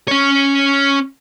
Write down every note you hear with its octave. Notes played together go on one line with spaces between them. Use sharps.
C#4 C#5